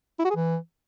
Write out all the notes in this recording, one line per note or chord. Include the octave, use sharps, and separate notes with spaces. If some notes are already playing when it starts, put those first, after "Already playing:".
E4
F#4
G#4
E3